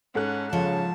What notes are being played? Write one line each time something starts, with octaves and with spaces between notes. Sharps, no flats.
G#2 C#4 A4 F#6
C#3 F3 C#5 A5